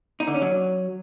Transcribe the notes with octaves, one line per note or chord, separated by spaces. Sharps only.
D#4
D3
C#4
F#3